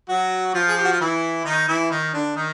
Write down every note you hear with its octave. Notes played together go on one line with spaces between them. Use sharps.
F#3 F#4
F3 F4
G#4
G4
F#4
F4
E3 E4
D#3 D#4
E3 E4
D#3 D#4
D3 D4
D#3 D#4